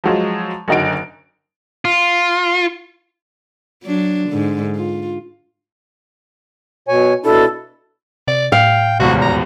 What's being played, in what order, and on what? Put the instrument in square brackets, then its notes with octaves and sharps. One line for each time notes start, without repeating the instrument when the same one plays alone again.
[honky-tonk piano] F3 F#3 G#3
F#1 D3 D#4 F#4 D7
[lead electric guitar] F4
[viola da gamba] F#3 D4
G#2 D3
F4
[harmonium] B2 C#5 G#5
[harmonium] B2 D4 E4 [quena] A4
[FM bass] C3 [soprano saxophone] D5
[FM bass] A2 [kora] F5 [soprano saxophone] G5
[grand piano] D#1 G#1 E2 [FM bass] C3 [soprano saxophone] F#4
[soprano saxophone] A#5